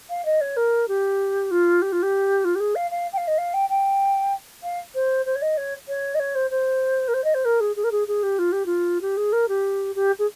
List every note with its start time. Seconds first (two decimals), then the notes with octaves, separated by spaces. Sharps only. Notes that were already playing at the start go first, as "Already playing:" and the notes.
0.09 F5
0.25 D#5
0.41 C#5
0.56 A#4
0.88 G4
1.51 F4
1.82 G4
1.92 F4
2.02 G4
2.44 F4
2.55 G4
2.60 G#4
2.75 F5
2.91 F5
3.13 G5
3.17 F5
3.27 D#5
3.38 F5
3.54 G5
3.69 G5
4.63 F5
4.95 C5
5.26 C5
5.35 C#5
5.42 D#5
5.57 C#5
5.88 C#5
6.15 D#5
6.19 C#5
6.35 C5
6.50 C5
7.08 A#4
7.14 C5
7.24 D#5
7.34 C5
7.45 A#4
7.60 G#4
7.76 G#4
7.84 A#4
7.91 G#4
8.07 G#4
8.23 G4
8.39 F4
8.52 G4
8.66 F4
9.01 G4
9.17 G#4
9.32 A#4
9.48 G4
9.95 G4
10.19 G#4